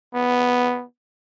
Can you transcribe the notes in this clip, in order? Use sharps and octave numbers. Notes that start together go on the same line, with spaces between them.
B3